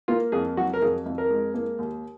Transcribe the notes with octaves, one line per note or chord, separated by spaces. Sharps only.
A#3 F4
F2 G#4
F#3 F#4
A#4
F2 G#4
F2
A#4
G#3
A#3
D#2